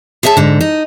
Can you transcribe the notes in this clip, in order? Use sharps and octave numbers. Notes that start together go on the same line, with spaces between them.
G#4 C#5 E5 G#5 A5
G#2 D3
D#4